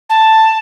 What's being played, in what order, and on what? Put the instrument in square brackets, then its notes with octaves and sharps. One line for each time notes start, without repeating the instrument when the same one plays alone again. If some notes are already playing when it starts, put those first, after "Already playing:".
[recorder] A5